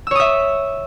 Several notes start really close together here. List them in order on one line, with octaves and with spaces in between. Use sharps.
E6 C#5 D#6 E5